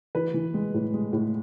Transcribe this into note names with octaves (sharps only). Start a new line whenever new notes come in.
E3 B4
E3
G#3
A2
G#3
A2